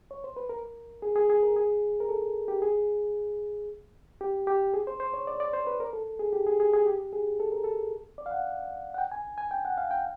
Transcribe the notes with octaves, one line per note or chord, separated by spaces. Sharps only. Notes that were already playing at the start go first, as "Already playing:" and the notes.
C#5
C5
B4
A#4
G#4
G#4
G#4
A#4
G#4
A#4
A4
G4
G#4
G4
G4
G#4
C5
C5
C#5
D5
D5
C5
B4
A#4
A4
G#4
G4
G#4
G#4
G#4
G4
G#4
A4
A#4
A4
D5
F5
F#5
F#5
G5
G#5
G#5
G5
F#5
F5
G5